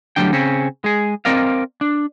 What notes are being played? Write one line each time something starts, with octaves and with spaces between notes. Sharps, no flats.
D2 G2 F#3 G3 D4 G5
C#3 C4 C#4
G#3 G#4
C4 A#4 D5 D#5 F5
D4